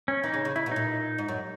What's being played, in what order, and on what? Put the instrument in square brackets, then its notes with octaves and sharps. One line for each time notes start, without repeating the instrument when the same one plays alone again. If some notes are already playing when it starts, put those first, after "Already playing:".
[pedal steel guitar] C#4
[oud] E3 [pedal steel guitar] D#4
[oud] C#3
C#3
[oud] C#3 [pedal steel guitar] E4
[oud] B2
[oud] A#2 [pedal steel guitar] D#4
[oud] G#2
F#2